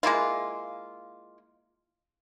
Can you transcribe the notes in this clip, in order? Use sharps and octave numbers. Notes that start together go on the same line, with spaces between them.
G#3 A#3 E4 F4